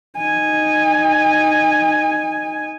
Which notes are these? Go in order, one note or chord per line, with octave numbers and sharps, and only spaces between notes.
D#4 G#5